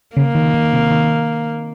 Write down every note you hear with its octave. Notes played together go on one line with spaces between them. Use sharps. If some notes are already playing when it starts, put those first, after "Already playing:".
C#3 A#3
D#3
D#3
C3
D#3